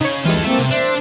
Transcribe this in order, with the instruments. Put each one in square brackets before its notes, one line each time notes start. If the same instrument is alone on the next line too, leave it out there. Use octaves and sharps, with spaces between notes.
[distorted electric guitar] C#3 [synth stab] D#4 C#5
[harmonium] D2 [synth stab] E3 G3 G#3 [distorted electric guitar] F4 A4
[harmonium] A#3 C4 [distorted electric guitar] A4 E5
[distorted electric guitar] C3
[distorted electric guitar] D4 [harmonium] C5 E5